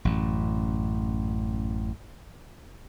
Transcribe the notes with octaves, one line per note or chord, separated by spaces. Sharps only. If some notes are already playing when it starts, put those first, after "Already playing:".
A1 F#2 A2